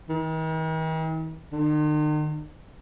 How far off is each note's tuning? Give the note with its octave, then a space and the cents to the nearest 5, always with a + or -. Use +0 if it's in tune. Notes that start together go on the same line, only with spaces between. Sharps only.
D#3 +45
D#3 -45